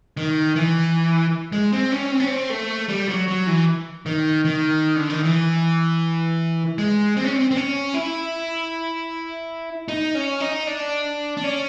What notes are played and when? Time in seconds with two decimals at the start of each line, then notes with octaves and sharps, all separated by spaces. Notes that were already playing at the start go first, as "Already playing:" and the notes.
0.17 D#3
0.56 E3
1.53 G#3
1.73 C4
1.92 C#4
2.12 C4
2.20 C#4
2.27 C4
2.50 A3
2.89 G3
3.08 F#3
3.28 F#3
3.47 E3
4.06 D#3
4.45 D#3
4.96 D3
5.10 D#3
5.23 E3
6.78 G#3
7.17 C4
7.24 C#4
7.33 C4
7.51 C4
7.56 C#4
7.94 E4
9.88 D#4
10.15 C#4
10.40 D#4
10.67 D4
11.37 D4
11.44 C#4